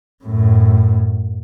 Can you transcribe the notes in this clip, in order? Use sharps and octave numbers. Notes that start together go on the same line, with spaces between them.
F#2 A2